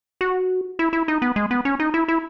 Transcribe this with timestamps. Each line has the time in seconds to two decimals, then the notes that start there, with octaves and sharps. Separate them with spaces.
0.21 F#4
0.79 E4
0.93 E4
1.08 D#4
1.22 B3
1.36 G#3
1.51 B3
1.65 C#4
1.80 D#4
1.94 E4
2.08 E4